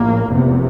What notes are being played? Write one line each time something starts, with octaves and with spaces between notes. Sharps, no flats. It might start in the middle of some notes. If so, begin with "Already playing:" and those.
Already playing: A#1 A2 A#3
F1 E2 C3